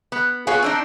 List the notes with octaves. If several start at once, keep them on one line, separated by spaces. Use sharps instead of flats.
B3
B3 F4 G#4 C#5
C4 D4 D#4